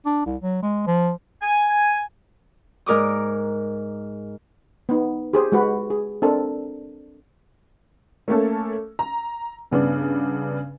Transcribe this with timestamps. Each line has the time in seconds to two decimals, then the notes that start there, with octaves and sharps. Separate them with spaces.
0.06 D4
0.26 C2
0.42 F#3
0.63 G#3
0.87 F3
1.42 G#5
2.86 G#2 A#4 D6 D#6
4.89 B3 D#4
5.33 G4 G#4 C5
5.52 G#3 F#4 B4
5.90 G#4
6.22 C4 D4 A4 A#4
8.28 A3 A#3 C#4 A4
8.99 A#5
9.71 G2 C#3 B3 D4